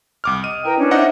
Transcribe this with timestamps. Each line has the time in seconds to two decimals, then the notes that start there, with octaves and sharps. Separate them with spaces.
0.24 C2 D6 F6
0.44 D#5 D#6 D#7
0.65 E4 A#4 B4 G5 A#5
0.78 C#4 D4
0.91 D#4 C5 D#5 E5 F#5